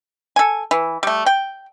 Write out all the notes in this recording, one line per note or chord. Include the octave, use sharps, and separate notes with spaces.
A4 G#5
E3
G3 A3
G5